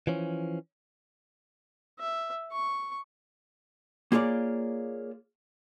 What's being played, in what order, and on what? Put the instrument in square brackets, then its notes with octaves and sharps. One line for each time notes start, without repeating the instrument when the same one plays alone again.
[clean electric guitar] E3 F3 C#4
[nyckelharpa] E5
C#6
[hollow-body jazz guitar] A#3 F4 G#4 C#5 D5